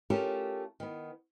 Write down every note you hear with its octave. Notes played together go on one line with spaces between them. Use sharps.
A3 C#4 F4 G4 A4 A#4
D#3 B3